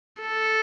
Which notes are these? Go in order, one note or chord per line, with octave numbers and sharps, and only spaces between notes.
A4